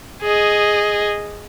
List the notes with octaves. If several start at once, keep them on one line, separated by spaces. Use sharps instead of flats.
G#4 D#5